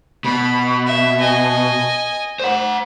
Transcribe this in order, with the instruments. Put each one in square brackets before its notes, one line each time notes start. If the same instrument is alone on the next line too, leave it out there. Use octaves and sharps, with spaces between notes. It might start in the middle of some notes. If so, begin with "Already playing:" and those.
[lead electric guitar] B2 [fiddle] B5
[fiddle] E5
D#5 G#5
[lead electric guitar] C5 F#5